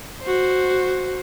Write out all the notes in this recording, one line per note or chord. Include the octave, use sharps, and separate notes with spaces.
F#4 C5